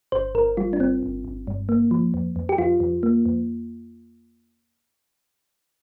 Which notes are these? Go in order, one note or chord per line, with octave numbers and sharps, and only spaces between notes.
G1 C5
G1 A#4
G3 F4
D4
G1 C4
G1
G1
G2
A#3
F3
F2
F2
G4
F2 F4
F2
A#3
F2